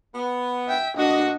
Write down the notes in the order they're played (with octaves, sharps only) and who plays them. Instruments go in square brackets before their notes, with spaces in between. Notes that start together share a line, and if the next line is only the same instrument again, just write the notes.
[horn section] B3
[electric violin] E5 G5
[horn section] A#2 A3 F#4 [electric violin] D4 D#5